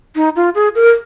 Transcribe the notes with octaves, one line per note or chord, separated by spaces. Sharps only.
D#4
F4
G#4
A#4